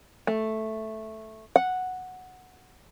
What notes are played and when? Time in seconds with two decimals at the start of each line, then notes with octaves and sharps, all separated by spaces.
0.27 A3
1.56 F#5